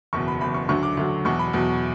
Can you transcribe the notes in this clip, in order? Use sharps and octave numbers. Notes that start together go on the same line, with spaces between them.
F#1 E2 B2 C#6
B5
F#1 E2 B2 B5
C#6
D2 D3 F#3 C#6
D6
D2 D3 F#3
E2 B2 F#3 C#6
B5
E2 B2 F#3